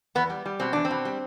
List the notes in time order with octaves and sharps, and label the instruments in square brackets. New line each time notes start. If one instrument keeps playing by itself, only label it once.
[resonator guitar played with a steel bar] E2 B3
G3
G3
B2 C4
E2 D4
C4
B2
G3